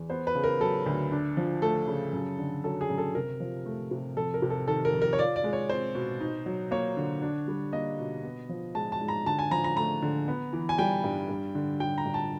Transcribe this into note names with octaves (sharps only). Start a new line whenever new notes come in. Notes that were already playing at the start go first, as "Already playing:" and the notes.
Already playing: E2
B3 C5
B4
C#3
A#4
F#3 A4
D2
D4
F3
A3 A4
C#3
F#2
D3
F#3 A4
G#4
F#2
A4
C3 A#4
F3
A3
C3
F2 A4
A#4
C3
A4
D#3 A4
A#4
F2
A#4
C#5
F4 D5
D5
G#3
C#5
C4 C5
B2
D#4
F#3
A#3 C#5
D3
D4
G3
A#3 D#5
B2
B3
F3
G#3 A5
A5
G#2
A#5
D3 A5
G#5
F3 A#5
A#5
A3 A#5
D3
B3
E3
G#5
G3 G5
G2
G2
D3
G3 G5
A#5
G2
A5